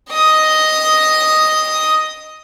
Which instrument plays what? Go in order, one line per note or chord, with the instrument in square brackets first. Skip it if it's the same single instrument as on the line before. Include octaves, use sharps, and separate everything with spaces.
[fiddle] D#5 D#6